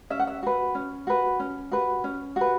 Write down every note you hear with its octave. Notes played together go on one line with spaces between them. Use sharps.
C#4 E5
F#5
E5
F#4 B4
C#4
F#4 B4
C#4
F#4 B4
C#4
F#4 B4